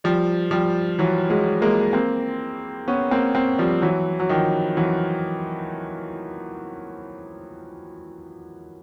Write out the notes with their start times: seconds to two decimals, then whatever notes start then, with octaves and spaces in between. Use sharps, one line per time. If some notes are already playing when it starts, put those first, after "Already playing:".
0.04 F3 G3
0.51 F3 G3
0.99 E3 F#3
1.30 F#3 G#3
1.62 G#3 A#3
1.93 A#3 C4
2.88 B3 C#4
3.11 A#3 C4
3.35 A#3 C4
3.58 F3 G3
3.82 E3 F#3
4.19 F#3
4.29 D#3 F3
4.77 E3 F#3